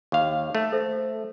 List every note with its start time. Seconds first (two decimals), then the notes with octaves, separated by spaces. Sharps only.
0.12 D#2 F5
0.55 A3
0.72 A4 C5 E5